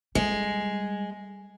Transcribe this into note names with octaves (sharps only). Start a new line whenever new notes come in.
G3 G#3